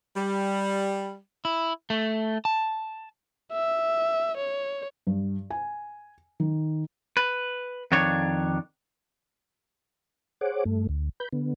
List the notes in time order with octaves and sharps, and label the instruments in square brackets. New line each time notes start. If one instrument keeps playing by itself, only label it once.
[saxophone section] G3
[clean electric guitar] E4
A3
A5
[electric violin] E5
C#5
[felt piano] G2
G#5
D#3
[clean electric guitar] B4
F2 D#3 D4 C#5
[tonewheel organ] G#4 C5 C#5 F#5 D6
G2 A3
D2
B4 B5 G6
D3 B3